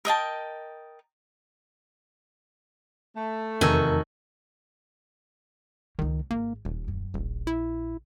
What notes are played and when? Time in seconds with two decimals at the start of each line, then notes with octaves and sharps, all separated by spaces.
0.05 A#4 D#5 G5 A5
3.16 A3
3.61 F1 E2 D#3 F#4 A#4 G#5 E6
5.99 C#2 D#3 A#3
6.31 G#1 A#3
6.65 D#1 D#2
6.88 F#2
7.14 D#1 A#1
7.47 E4